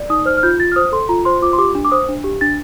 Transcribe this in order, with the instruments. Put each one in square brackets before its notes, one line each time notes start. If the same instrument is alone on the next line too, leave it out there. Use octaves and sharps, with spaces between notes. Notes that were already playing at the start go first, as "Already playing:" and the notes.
Already playing: [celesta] D5
D#4 D#6
C5 F6
F6
F4 G6
F4 A6
F6
C5 D#6
A4 C6
F4 A#5
C5 C6
F4 D6
C6
G4 D6
D4
D6
C5 D#6
D4
G4
D4 A6